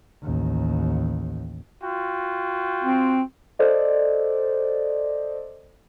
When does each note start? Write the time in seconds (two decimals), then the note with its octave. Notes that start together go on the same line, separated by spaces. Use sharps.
0.23 A1 D#2
1.84 F4 F#4 G5
2.84 C4
3.59 A4 C5 D5 D#5